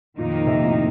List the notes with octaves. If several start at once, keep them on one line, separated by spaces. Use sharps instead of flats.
F2 A#2 D#3 A#3 D#4
C3
A2